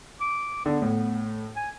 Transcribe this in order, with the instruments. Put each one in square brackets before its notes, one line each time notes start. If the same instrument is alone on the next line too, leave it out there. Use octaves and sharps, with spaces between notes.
[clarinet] D6
[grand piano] D3 [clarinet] B3
[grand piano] A2
[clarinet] G#5